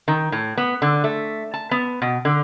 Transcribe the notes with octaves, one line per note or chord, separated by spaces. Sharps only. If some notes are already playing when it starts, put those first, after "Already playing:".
D#3
A2
B3
D3
A3
A5
B3
B2
D3